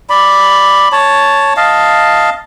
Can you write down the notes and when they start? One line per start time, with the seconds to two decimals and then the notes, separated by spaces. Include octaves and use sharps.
0.10 D5 B5
0.92 C#5 A5
1.57 D#5 F5 A5